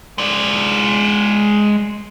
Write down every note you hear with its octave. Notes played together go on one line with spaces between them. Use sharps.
G#3 D5